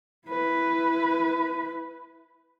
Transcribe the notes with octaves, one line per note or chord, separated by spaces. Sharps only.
E4 B4